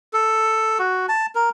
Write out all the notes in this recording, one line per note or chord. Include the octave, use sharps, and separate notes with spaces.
A4
F#4
A5
A#4